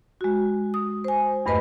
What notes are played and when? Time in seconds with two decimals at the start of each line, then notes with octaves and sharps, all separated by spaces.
0.21 G#3 F#4
0.74 D#6
1.04 C5 G#5
1.46 E2 G2 A3 B4 D#5